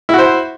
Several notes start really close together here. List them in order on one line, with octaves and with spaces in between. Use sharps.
E4 F#4 C5